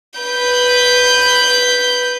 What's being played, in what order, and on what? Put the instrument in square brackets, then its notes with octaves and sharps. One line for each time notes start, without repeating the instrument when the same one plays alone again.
[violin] B4 G6